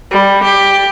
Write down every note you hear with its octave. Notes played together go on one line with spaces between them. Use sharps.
G3
G4